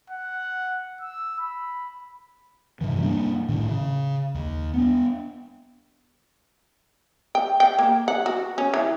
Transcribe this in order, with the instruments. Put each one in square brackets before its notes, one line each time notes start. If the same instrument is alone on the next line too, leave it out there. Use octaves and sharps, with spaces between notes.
[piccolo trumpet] F#5
E6
B5
[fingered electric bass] G2 C3 E3
G3 A#3 C#4 D4
A2 D#3
C#3
D#2
B3 D4
[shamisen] G5
G5
A#3
F#5
F#4
C#4
E3